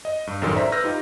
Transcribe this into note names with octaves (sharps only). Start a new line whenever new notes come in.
D#5
G2
A1 F#2 D#3 A4 A#4 C6
C5 D5 E5 A#5 B6
B4 E6 F6 G6 A#6
D#4 F4 G4